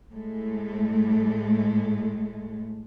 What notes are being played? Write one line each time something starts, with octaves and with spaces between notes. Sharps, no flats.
A2 G#3 A3